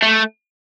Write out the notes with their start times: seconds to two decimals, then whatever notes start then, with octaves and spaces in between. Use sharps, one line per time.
0.02 A3